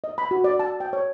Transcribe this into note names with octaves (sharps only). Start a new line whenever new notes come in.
D#5
B5
F#4
D5
A5
G5
C#5